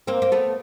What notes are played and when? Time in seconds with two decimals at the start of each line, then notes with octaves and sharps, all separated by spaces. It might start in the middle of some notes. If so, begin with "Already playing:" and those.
0.07 A#3 C4
0.22 A#3
0.32 A3 B3